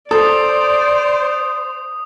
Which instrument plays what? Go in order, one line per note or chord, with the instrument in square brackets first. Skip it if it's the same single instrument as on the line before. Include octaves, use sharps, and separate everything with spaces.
[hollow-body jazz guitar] A4 [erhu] C5 [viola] D5 [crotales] D#6